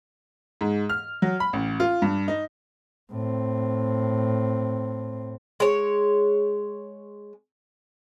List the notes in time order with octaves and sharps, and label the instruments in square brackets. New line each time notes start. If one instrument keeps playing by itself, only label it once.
[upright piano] G#2
F6
F#3
B5
A1
F4
G2
D#4
[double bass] A2 C4
[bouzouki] G#3 C#5